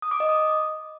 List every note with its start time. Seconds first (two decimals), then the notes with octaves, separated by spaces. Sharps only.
0.02 D#6
0.11 D6
0.20 D#5
0.29 D#6